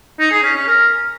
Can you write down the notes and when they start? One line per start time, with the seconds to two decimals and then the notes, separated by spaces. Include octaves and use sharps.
0.20 D#4
0.31 G#4
0.43 C#4
0.55 C#4
0.67 A#4